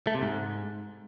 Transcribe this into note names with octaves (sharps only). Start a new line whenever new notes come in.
A3
C3
G#2